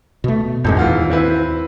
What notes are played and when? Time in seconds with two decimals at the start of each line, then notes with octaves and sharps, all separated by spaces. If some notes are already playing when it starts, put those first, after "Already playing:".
0.24 B2 A3
0.64 D#1 F2 G#2 G#3
0.77 D#2 E3 F4 F#4
1.10 C4 E4 B4